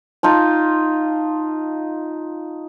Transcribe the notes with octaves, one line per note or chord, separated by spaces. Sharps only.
D#4 F4 A5